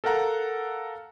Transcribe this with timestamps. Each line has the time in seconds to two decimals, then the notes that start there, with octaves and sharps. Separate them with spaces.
0.04 A4 A#4 F5 F#5 A#5